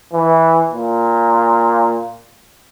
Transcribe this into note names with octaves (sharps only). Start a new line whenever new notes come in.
E3
A#2